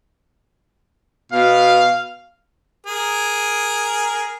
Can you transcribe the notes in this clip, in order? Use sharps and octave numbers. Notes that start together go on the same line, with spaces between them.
B2 F5
G#4 A#4